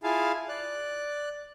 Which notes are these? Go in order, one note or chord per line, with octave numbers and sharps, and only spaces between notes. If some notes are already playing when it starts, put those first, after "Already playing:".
E4 F4 G#4 F5 G#5 A5
D5 F#6